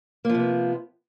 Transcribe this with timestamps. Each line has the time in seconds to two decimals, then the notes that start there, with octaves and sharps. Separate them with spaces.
0.25 A#3
0.30 F3
0.34 C3
0.39 B3